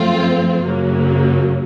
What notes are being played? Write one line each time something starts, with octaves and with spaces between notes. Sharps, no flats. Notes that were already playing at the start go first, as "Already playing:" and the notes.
Already playing: F#2 F3 A3 C4 F4
F#2 C#3 F#3 A#3